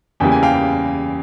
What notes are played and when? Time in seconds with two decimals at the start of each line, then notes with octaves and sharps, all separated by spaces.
0.20 E2 C#3 E3 G3 A#3 G5
0.32 G#5
0.43 F5 G5